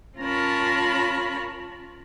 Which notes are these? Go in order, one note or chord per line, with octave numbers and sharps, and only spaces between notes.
C#4 F4 A#4 C#5 A5 B5